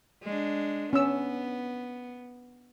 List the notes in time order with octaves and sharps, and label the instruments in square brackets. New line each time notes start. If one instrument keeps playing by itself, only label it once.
[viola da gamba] G#3 D4
[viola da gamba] B3 [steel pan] C#4 E6